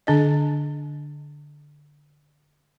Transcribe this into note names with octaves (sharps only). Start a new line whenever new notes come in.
D3 D4 D#5